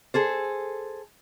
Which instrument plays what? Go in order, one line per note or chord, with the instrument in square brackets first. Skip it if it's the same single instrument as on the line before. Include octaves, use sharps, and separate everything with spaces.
[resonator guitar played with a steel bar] G#4 A4 C5